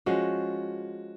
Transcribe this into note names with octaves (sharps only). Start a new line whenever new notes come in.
F3 G#3 C#4 F#4